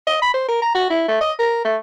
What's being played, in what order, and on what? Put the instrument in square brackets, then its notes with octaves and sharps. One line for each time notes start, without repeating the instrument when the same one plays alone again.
[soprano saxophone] D#5
B5
C5
A#4
A#5
F#4
E4
A3
D#5
A#4
A3